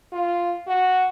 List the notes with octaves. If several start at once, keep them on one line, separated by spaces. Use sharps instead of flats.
F4
F#4